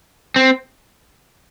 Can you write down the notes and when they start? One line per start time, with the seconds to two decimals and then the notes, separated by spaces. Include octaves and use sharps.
0.36 C4